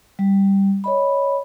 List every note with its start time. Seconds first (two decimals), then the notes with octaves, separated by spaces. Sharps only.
0.19 G3
0.84 C#5 D#5 B5